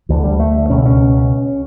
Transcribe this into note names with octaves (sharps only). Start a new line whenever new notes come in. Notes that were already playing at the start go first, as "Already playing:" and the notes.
D2 D3 E3
G3
A3
C#2 B2 C#4
C#4